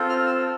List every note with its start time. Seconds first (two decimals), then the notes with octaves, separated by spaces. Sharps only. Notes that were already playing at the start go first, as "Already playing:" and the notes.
Already playing: C4 F4 A4
0.09 F6
0.26 E6